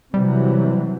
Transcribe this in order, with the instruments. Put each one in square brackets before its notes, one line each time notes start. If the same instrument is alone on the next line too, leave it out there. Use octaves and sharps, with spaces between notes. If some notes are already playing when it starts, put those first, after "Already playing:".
[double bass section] C3 E3 F#3 [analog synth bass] G3